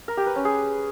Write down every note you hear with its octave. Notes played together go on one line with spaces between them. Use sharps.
A#4
G4
B4
C#4
G#4